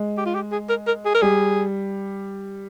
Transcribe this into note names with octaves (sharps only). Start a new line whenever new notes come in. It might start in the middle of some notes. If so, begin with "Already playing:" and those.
Already playing: G#3
G4
F4
G4
G#4
A#4
A#4
G#4
A#4
G3 G#4